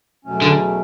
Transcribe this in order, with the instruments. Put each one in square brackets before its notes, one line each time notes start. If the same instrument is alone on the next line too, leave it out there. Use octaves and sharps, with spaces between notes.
[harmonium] E2 B2 F#3 A3 C#4
[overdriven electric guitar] D3